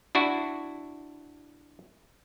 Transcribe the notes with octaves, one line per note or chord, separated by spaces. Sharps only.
D4 E4 F#4